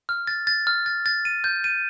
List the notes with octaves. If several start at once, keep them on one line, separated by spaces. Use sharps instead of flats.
F6
A6
A6
F6
A6
A6
D#7
G6
D#7